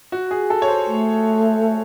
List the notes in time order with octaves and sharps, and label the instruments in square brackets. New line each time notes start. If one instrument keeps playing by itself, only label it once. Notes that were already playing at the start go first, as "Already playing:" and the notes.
[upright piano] F#4
G#4
A4
C#5
C5
[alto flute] A3